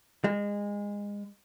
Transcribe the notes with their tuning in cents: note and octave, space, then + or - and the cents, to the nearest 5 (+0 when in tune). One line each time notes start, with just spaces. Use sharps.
G#3 -25